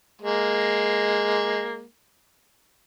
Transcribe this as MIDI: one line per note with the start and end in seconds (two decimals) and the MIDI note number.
0.22 1.83 56
0.22 1.83 58